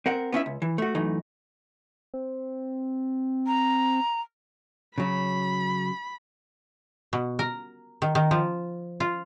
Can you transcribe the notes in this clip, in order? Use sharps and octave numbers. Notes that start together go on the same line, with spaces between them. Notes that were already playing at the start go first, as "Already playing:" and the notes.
C4 A#4 F#5
B3 C#4 E4 E5
C#2
E3
A3 F#4
F#2 E3 A3 D#4
C4
A#5
C#3 F#3 B5
B2
A#4
D#3
D#3
F3
F4